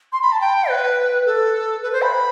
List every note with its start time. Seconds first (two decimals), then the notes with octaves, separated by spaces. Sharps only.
0.13 C6
0.22 B5
0.32 A5
0.41 G5
0.69 B4
1.26 A4
1.82 B4
1.92 C5
2.02 B5